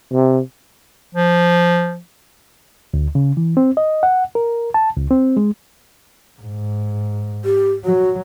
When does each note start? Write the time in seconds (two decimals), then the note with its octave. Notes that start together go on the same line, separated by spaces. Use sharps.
0.13 C3
1.15 F3
2.94 D2
3.15 C#3
3.37 E3
3.57 C4
3.77 D#5
4.03 F#5
4.35 A#4
4.74 A5
4.97 C#2
5.11 C4
5.37 G#3
6.41 G#2
7.45 G4
7.85 F#3 F#4